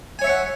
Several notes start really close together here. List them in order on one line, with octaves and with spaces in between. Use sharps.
G#5 C#5 E5 C#6 F#5